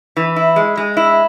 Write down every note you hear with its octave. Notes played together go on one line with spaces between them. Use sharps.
E3
E4
G#3
G#3
E4